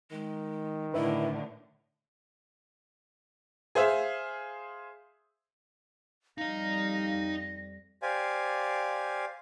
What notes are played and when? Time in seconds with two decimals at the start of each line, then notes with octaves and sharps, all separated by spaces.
0.11 D#3 G#3
0.94 A2 D3 E4 B4 E5
3.75 G#4 C5 E5 F5
6.38 F2 G3 D#4 D#5 F5 A#6
8.02 G4 C5 D5 F5 G#5